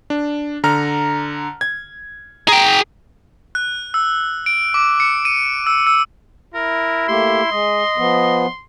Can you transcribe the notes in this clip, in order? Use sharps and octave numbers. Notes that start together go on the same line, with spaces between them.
D4
D3 A#5 F6
G#6
G#4 G5 A#5
F#6
E6
D7
D6
C#7
D#7
E6
E6
E4 A#4
A3 A#3 G4 C6
G#3 D#5
F3 B3